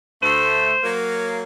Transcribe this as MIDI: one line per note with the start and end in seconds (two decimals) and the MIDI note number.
0.23 0.73 38
0.23 0.73 57
0.23 0.96 72
0.84 1.43 54
0.84 1.43 58